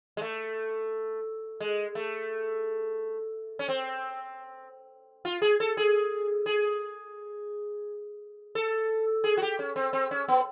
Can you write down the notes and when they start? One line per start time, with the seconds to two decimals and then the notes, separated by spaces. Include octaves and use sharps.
0.17 G#3
0.22 A3
1.60 G#3
1.95 A3
3.59 C#4
3.69 C4
5.25 F4
5.42 G#4
5.60 A4
5.77 G#4
6.46 G#4
8.55 A4
9.24 G#4
9.37 F#4
9.42 G4
9.59 C#4
9.76 C4
9.93 C4
10.11 C#4
10.28 B3